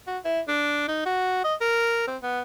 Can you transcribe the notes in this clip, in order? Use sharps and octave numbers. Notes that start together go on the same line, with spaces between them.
F#4
E4
D4
D#4
F#4
D#5
A#4
C4
B3